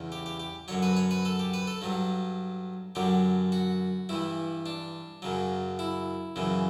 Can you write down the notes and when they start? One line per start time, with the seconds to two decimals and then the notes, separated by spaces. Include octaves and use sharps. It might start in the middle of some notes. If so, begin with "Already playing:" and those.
Already playing: E2 C#3 E3
0.12 G4
0.26 G4
0.40 G4
0.68 F#2 D3 F#3 C#5
0.83 B4
0.97 C#5
1.11 B4
1.25 A4
1.39 G4
1.54 B4
1.67 A4
1.82 G2 F#3
2.95 F#2 D3 F#3 G4
3.52 F#4
4.09 G2 E3 E4
4.66 D4
5.22 F#2 C#3 F#3
5.79 E4
6.36 F#2 C#3 E3